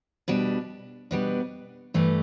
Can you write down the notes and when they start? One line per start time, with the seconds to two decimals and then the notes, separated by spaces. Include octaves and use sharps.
0.28 B2 G3 D4
1.11 B2 G3 B3 D4
1.94 G2 E3 A3 G4